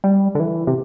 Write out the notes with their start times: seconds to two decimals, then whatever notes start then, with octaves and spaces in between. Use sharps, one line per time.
0.04 G3
0.35 D3
0.40 E3
0.67 C3